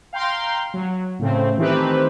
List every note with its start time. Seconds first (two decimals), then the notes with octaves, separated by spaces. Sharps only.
0.13 F5 G5 A#5 C6
0.74 F#3
1.19 A2 C#3 A3 C4
1.57 D#3 E3 A3 C4 G4 B4